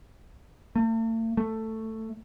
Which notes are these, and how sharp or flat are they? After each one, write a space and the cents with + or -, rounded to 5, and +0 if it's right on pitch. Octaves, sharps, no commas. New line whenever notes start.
A3 +45
A3 +10